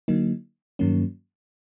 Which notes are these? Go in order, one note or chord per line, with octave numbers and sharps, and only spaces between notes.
D3 F#3 A#3 D#4
G2 D#3 F#3 A#3 C#4